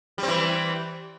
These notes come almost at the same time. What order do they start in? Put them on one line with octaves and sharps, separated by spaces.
G3 C4 E3